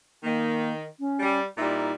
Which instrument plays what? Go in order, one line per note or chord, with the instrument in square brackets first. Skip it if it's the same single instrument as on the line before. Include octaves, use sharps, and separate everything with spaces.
[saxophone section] D#3 [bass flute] A#3
[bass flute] C#4
[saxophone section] G3
[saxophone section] A#2 G3 E4 [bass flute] D#4